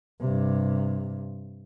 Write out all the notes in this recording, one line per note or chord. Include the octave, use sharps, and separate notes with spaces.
G2 C3